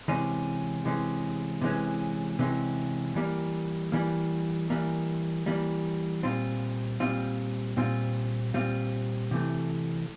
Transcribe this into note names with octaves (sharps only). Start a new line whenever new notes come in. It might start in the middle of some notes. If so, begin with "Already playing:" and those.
C3 E3 G#3 C#4
C3 E3 G#3 C#4
C3 E3 G#3 C#4
C3 E3 G#3 C#4
E3 G3 A#3
E3 G3 A#3
E3 G3 A#3
E3 G3 A#3
A#2 G3 C4 F4
A#2 G3 C4 F4
A#2 G3 C4 F4
A#2 G3 C4 F4
C3 E3 A3